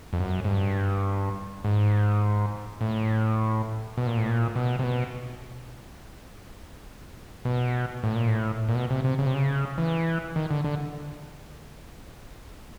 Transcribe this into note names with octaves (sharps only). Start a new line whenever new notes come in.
F2
F#2
G#2
G2
G#2
A2
B2
A#2
A2
A#2
B2
C3
B2
B2
A2
A#2
A2
A#2
B2
C3
C3
C#3
C3
C#3
E3
D#3
D3
D3